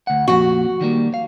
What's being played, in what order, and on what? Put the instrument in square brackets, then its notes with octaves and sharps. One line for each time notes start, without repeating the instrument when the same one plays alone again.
[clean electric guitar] D2 F#5
[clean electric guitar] F2 A#2 [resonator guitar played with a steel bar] F#4
[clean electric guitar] D#3 G3 A#3
F5